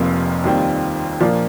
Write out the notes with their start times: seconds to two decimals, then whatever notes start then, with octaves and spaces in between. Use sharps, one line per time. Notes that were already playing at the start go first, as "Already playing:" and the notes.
Already playing: F1 F2 C3 F3 A#3
0.44 D#2 D#3 G3 C4 F4
1.20 A#2 F3 A#3 D4